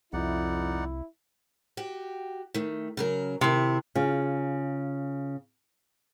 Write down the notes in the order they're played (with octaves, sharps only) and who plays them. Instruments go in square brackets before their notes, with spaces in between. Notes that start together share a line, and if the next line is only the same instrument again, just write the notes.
[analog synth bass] C2 [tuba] F2 [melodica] D#4 D5 F#5 [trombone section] E4
[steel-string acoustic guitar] F#4 G4
D#3 A3
C#3 F#3 A#4
[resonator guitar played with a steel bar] C3 [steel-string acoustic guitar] D#3 E4
[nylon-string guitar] C#3 F4